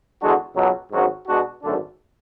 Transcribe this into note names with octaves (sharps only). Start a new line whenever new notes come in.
E2 D3 G#3 D4 F#4
C#2 B2 F#3
G#1 G#2 F#3 C#4 F#4
B2 G#3 D4 F#4
G#1 F#2 D3 A3 D4